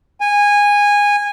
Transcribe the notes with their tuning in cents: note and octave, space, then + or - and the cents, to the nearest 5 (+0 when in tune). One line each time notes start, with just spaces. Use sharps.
G#5 -15